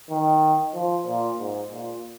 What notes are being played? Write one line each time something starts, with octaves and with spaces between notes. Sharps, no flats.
D#3
F3
A#2
G#2
A#2